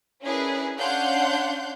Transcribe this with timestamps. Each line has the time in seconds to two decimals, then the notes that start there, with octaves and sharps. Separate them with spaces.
0.23 C#4 D4 E4 G#4 A#4 B4
0.77 C#4 D4 F5 F#5 C6 G6